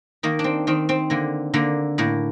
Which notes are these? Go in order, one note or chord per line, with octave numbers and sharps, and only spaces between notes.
D#3 A#3
D4
C4
D#3 C4
C4
D3 A#3
D3 A#3
A2 A#3